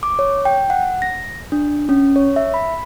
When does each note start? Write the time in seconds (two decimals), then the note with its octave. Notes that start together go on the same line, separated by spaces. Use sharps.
0.03 D6
0.19 C#5
0.45 G5
0.70 F#5
1.02 A#6
1.52 D4
1.89 C#4
2.16 C#5
2.36 E5
2.54 B5